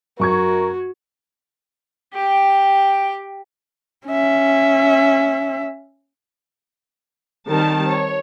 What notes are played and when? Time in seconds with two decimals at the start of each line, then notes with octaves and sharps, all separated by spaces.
0.19 F#2 F#4 A#4 C#6 G#6
2.14 G4 G5
4.07 C#4 E5
7.48 D#3 G3 C4 A#4 A5
7.87 C#5